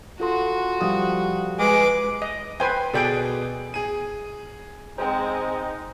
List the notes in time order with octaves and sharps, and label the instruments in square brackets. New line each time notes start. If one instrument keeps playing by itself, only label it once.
[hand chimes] F4 A4 C6 [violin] F#4
[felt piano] F3 G3 D#6
[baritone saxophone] G#3 [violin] B4 D6
[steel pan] D#5
[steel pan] B4 C5 G#5 [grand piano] G5
[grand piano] B2 G#4 D7 [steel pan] A4 D5 G5
[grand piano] G#4 D#7
[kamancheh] G#3 C4 [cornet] D#4 [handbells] C5 G5